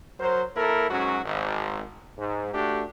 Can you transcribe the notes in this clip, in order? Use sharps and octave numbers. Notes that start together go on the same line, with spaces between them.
F#3 A#4 C5
A#3 E4 A4 A#4
G#2 F#3 C#4 F#4
G#1
G#2
A3 D4 F#4 G4